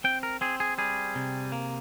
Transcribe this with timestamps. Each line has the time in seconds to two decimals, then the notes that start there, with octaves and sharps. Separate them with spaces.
0.04 C4 G5
0.23 A#4
0.41 C4 G#4
0.60 G#4
0.78 G3 G#4
1.15 C3
1.52 A#3